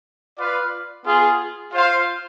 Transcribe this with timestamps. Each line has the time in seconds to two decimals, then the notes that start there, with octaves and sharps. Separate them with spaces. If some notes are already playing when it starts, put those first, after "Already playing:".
0.38 F4 B4 D5 F5
1.05 B3 F4 G#4
1.72 F4 C5 F5